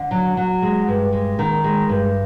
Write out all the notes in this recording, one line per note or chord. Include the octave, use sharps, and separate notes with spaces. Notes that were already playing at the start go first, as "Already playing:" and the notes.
Already playing: D3
F#3
F#3
G#3
G2
G#3
D#3
G#3
G2